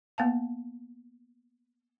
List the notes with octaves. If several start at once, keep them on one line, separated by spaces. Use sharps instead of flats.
A#3 B3 F5 A5